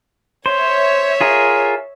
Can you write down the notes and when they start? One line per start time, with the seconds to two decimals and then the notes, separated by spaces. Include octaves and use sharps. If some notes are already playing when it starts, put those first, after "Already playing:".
0.46 C5 C#5 E5
1.21 F4 G#4 A#4